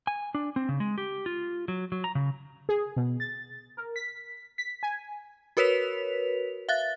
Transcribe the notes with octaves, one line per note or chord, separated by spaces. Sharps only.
G#5
D4
C4
C#3
G#3
G4
F4
F#3
F#3
A#5
C#3
G#4
B2
A6
A#4
B6
B6
G#5
F#4 A#4 B4 C#5 B6 F7
E5 F5 F#6 A6